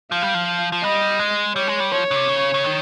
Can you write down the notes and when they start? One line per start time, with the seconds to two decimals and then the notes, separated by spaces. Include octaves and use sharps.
0.12 F3 F5
0.22 G3
0.34 F3
0.72 F3
0.83 G3 D#5
1.19 G#3
1.55 G3 C#5
1.68 G#3
1.80 G3
1.92 F3 C#5
2.11 C#3
2.16 C3
2.28 C#3
2.54 C#3
2.64 D#3